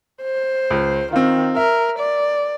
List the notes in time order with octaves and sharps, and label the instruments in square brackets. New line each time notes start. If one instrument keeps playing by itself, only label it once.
[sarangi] C5
[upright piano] C#2
[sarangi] D#3 [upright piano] C4 F4
[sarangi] A#4 [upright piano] E5
[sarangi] D5